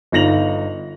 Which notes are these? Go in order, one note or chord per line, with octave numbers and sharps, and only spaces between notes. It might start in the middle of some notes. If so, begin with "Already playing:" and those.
G1 D#4 F4 A#6 F7 F#7